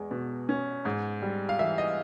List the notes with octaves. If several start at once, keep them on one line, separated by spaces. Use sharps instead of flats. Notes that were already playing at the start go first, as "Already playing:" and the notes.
Already playing: E2 G#3
B2
C#4
G#2
G3
F5
E3 E5
D#5